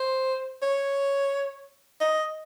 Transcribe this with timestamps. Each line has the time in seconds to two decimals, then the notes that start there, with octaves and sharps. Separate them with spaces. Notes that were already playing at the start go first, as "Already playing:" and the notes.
Already playing: C5
0.62 C#5
2.00 D#5